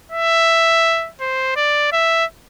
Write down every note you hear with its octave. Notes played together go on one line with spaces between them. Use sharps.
E5
C5
D5
E5